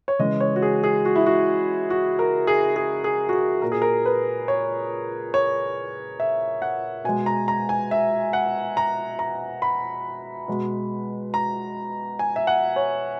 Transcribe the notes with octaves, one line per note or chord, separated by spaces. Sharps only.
C#5
C#3 E3 G#3 D#5
C#5
F#4
G#4
G#4
F#4
E4
F#4
F#4
A#4
G#4
G#4
G#4
F#4
G#4
A#2 A#3 A#4
G#4
A#4
B4
C#5
C#5
E5
F#5
B2 G#3 G#5
A#5
A#5
G#5
E5
F#5
A#5
A#5
B5
B2 G#3
A#5
G#5
E5
F#5
C#5